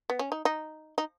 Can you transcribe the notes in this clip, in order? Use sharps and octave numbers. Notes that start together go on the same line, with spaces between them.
B3
C#4
D#4
D#4
D#4